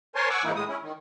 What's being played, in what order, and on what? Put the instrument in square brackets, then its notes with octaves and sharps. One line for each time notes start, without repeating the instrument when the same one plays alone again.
[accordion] A#4 C5 C#5 G#5 A5 C6
F#5 G#5 C#6 D6 E6
G#2 E3 A#3 D#4 E4
A2 G#3 D#6
C#4 E4
D#3